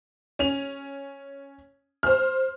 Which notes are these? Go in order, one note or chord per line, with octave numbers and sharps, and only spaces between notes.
C#4 F7
C5 F6